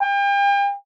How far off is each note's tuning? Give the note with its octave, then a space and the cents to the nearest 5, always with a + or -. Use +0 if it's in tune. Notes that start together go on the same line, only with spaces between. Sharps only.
G5 +40